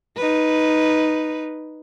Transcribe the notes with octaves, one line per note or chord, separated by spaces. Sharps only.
D#4 B4